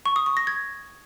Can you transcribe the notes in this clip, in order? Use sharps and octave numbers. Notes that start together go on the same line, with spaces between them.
C#6
D#6
C#6
A#6
G#6